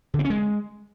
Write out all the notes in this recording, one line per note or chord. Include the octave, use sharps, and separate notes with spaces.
D3
C4
C#4
G#3